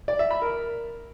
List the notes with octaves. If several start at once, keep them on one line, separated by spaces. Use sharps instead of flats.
D5
E5
B5
A#4